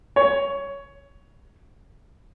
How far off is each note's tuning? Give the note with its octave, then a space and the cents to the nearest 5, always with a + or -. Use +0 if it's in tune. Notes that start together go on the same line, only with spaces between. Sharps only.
C#5 +10